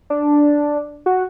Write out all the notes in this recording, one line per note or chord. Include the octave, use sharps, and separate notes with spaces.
D4
F#4